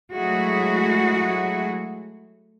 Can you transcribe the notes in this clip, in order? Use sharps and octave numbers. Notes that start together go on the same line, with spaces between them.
F#3 G#3 A3 E4 F#4 G#4